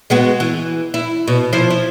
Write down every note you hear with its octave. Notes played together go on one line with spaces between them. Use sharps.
G#3 B3 F#4
E3
E4
B2
F3 E4 C5
E4